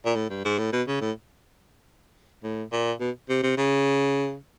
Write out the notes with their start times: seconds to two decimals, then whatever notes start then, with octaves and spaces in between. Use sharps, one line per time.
0.05 A#2
0.16 A2
0.30 G2
0.45 G#2
0.58 A2
0.72 B2
0.88 C#3
1.01 A2
2.43 A2
2.72 A#2
3.00 B2
3.29 C3
3.43 C3
3.57 C#3